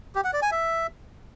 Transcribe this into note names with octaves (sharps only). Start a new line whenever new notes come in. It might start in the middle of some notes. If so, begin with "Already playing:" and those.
G4
F#5
D5
G#5
E5